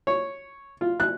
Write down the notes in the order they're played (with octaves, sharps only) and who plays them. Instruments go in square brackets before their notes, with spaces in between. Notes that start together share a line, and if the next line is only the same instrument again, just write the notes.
[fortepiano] C#5
F4
F#6